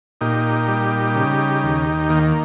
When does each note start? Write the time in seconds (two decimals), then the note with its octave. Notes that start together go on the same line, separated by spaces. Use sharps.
0.21 A#2 D#4 G4
0.68 G3
1.15 C#3
1.63 D#2
2.09 D#3 A#3